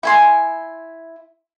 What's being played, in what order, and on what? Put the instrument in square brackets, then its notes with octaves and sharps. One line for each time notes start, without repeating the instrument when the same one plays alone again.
[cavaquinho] E4 G#5 C6